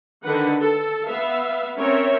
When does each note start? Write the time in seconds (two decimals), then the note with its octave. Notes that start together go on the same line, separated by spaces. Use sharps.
0.23 D3 D#3 B4 F#5
0.62 A4
1.07 B3 E5 F5
1.79 C4 C#4 A#4 C#5 E5